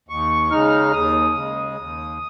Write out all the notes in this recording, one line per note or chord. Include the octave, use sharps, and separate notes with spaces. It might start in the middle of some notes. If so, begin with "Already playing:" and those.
D#2 C#6
C#3 G#3 D#4 F6
D#2 D#6
C#3 G#3
D#2